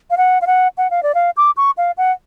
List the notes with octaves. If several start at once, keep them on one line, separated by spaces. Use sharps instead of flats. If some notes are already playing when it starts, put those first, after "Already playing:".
F5
F#5
F5
F#5
F#5
F5
D5
F5
D6
C#6
F5
F#5